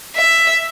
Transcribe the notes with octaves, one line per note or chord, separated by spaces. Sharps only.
E5